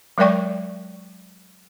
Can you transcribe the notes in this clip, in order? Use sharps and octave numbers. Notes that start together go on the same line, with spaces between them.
F#3 G#3 A#4 D5 G5 C#6